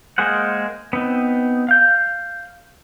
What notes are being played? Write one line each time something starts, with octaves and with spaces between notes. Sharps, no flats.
G#3 A#3 G#4 C5 F#5
B3 C4 D#4
F5 G6